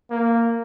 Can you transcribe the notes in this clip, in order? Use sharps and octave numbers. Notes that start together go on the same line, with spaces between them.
A#3